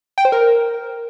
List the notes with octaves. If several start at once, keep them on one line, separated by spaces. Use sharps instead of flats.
G5
C5
A#4